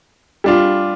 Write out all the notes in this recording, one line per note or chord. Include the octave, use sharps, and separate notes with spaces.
G3 D4 F4